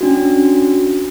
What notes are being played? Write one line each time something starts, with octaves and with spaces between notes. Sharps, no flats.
C#4 D4 F#4